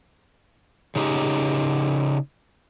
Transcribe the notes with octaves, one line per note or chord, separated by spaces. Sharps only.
C#3 D#4 G4